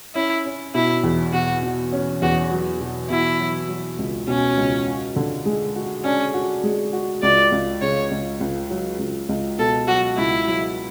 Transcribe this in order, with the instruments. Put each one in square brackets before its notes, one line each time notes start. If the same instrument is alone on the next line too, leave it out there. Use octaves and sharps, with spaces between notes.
[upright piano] C#4 [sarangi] E4
[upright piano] C#4
[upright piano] B2 [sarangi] E4
[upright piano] E2
[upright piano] B2 [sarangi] F#4
[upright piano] B2
C#4
[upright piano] E2 [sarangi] F#4
[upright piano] F#3
B2
[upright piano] B2 [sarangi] E4
[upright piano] F#3
F#3
C#2
[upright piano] B2 [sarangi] C#4
[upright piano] C#2
F#4
D3
G#3
F#4
[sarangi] C#4 [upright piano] D4
[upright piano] F#4
G#3
F#4
[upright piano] C#2 [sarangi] D5
[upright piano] C#2
[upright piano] C#3 [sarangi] C#5
[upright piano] C#2
C#2
F#3
C#2
C#2
[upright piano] B2 [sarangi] A4
[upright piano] F#3 [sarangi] F#4
[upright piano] C#2 [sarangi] E4
[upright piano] F#3